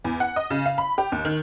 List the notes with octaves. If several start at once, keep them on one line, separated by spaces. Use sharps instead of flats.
E2
F#5
D#5
C#3
F5
B5
G4
D#2
D#3